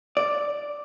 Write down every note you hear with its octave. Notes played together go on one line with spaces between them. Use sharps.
D5